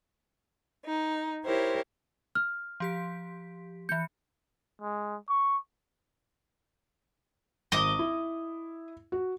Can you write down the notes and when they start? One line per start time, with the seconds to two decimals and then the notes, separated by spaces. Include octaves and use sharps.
0.85 D#4
1.45 E4 G4 A#4 C5 C#5
2.35 F6
2.80 F3 G4 B6
3.89 E3 G6 C#7
4.82 G#3
5.29 C#6
7.72 G#1 D#5 D6 D#6
7.99 E4
9.12 F#4